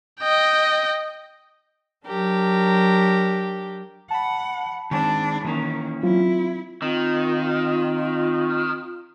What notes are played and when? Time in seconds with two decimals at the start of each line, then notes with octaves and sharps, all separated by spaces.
0.21 D#5 G5
2.06 F#3 D4 G4 A#4
4.11 F#5 A5 B5
4.91 D#3 G#3 C4 D4
5.44 D#3 E3 A#3 C#4
6.03 F#3 C4 E4 F4
6.82 D#3 C4 F4